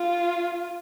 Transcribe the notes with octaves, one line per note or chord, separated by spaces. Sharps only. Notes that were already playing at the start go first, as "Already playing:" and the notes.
Already playing: F4